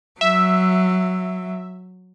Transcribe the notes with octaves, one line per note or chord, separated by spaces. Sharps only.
F#3 E5